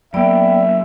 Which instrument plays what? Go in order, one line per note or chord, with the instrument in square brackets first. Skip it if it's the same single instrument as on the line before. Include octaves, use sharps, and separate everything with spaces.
[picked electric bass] F#3 A#3 [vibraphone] B3 D5 G5 [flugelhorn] E5